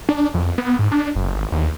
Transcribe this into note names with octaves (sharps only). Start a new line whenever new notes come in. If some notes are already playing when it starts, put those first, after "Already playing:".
D4
F2
B3
G#2
D4
F#1
G#1
D#2